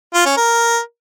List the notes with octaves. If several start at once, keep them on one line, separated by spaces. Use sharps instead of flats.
F4
C#4
A#4